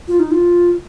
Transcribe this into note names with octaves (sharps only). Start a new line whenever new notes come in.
F4
D#4
F4